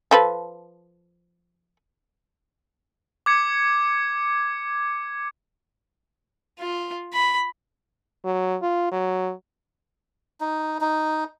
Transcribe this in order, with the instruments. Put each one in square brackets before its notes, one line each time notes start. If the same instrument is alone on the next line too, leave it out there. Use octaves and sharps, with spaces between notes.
[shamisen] F3 A4 B4
[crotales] D6 G#6 C#7
[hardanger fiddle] F4
B5
[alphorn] F#3
F4
F#3
[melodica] D#4
D#4